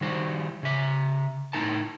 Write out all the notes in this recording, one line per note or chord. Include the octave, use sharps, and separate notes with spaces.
D#3 G3 F#4 C5
C#3 E5
A2 D#4 A#4 A5